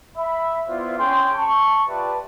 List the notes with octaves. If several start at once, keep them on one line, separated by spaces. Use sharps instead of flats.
E5 B5
B3 E4 F4 C5 D5 F5
C#4 G#4 G5 C6
A5 C#6
F4 G4 B4 D5 E5 A5